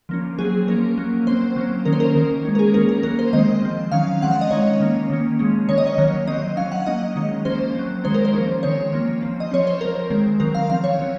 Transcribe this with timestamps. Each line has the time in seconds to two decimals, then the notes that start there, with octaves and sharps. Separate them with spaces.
0.09 F3 A#3 C#4
0.38 F#3 C4 G#4
0.68 F3 A#3 C#4 A#4
0.97 F#3 A#3 C#4
1.27 F#3 C4 C5
1.56 F#3 A#3 C#4
1.85 D#3 A#3 C#4 A#4
1.93 C5
2.00 A#4
2.15 D#3 A#3 C#4
2.45 D#3 G#3 C#4
2.55 A#4
2.59 G#4
2.74 D#3 A#3 C#4 A#4
2.89 A#4
3.03 F#3 A#3 C#4 A#4
3.19 C5
3.33 D#3 G#3 C4 D#5
3.62 F3 C4
3.92 D#3 F#3 C#4 F5
4.21 F3 G#3 C4 F#5
4.31 F5
4.41 D#5
4.51 D#3 G#3 C#4 C#5
4.81 D#3 A#3 C#4
5.10 D#3 A#3 C#4
5.39 F3 G#3 C#4
5.68 D#3 A#3 C#4 C#5
5.78 D#5
5.87 C#5
5.98 D#3 F#3 A#3 C#4
6.27 F#3 C4 D#5
6.57 C#4 F5
6.60 F#3
6.72 F#5
6.86 F#3 A#3 C#4 D#5
7.16 D#3 G#3 C#4
7.45 F3 A#3 C#4 C5
7.75 F#3 C4
8.04 D#3 G#3 C#4 C5
8.14 A#4
8.25 C5
8.34 F3 A#3 C#4
8.63 D#3 G#3 C4 C#5
8.93 F3 A#3 C#4
9.22 F3 C4
9.40 D#5
9.51 F3 C4 C#5
9.67 C5
9.81 F3 C4 A#4
10.10 D#3 G#3 C4
10.40 D#3 F#3 C4 A#4
10.55 F5
10.69 F3 C4 F5
10.84 C#5
10.99 F#3 C#4